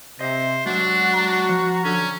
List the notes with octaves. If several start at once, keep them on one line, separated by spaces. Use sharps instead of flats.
C3 C5 D#5 E5
F#3 G#3 D4 F#4
A#5
F3
D3 C#4